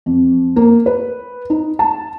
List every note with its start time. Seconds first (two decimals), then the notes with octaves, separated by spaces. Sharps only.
0.06 F2
0.56 A#3
0.86 B4
1.50 D#4
1.79 A5